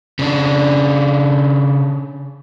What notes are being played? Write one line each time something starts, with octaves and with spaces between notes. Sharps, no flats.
C#3 D4